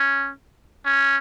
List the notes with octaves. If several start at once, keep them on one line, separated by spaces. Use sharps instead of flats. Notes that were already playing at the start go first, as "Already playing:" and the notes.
Already playing: C#4
C#4